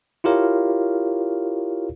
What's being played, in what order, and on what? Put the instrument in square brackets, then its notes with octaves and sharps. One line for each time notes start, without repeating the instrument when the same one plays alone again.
[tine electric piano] E4 F4 G4 A#4 C#5 F5